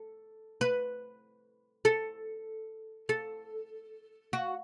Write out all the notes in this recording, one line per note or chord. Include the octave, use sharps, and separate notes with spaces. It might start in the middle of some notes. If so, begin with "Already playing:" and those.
Already playing: A4
B4
A4
A4
F#4